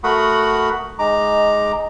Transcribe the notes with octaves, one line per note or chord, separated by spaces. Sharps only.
A3 F#4 A#4 F#5 B5 D#6
G#3 D#4 A#5 D6